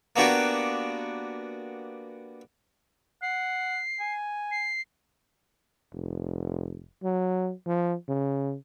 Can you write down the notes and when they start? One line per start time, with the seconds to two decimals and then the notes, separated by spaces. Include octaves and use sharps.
0.16 A#3 B3 D4 F#4 G4
3.22 F#5 C7
4.00 G#5
4.51 C7
5.93 F1
7.04 F#3
7.66 F3
8.09 C#3